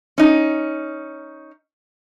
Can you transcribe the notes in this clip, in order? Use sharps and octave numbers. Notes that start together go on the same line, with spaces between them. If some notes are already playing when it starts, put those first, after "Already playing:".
C#4 D#4